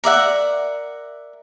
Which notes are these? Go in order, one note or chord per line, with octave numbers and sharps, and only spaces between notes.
A#4 D5 E5 F#5